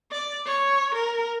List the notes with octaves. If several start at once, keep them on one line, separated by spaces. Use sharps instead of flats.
D5
C#5
A#4